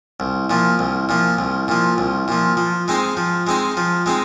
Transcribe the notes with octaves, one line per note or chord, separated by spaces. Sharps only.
C2
A#2 F3
C2
A#2 F3
C2
A#2 F3
C2
A#2 F3
F3
G#3 C4 D#4 C5
F3
G#3 C4 D#4 C5
F3
G#3 C4 D#4